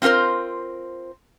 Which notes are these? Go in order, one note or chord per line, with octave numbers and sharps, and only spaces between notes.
C4 F4 F#4 A#4 C5